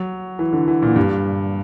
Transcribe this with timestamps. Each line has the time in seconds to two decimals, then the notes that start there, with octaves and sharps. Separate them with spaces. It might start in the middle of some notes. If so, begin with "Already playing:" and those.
Already playing: F#3
0.39 E3
0.53 D3
0.68 E3
0.82 A#2
0.96 G2